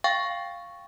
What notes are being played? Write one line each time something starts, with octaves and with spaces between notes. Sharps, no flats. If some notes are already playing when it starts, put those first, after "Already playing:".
F5 G5 C#6 A6